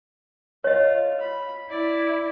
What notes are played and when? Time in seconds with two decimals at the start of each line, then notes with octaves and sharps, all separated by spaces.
0.64 F4 C#5 D#5
1.20 B5
1.70 E4 D5